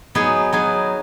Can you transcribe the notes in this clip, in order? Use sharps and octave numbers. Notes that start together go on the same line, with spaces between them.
F#3 B3 D#4 G#4
F#3 B3 D#4 G#4